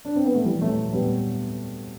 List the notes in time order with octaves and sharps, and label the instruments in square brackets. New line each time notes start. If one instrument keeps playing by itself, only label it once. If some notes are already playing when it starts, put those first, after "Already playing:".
[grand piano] D4
C4
B3
A3
E3 G3
F#3 A3
G3 B3